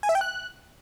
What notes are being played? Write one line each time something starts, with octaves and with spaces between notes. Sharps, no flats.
G#5
E5
G5
F#6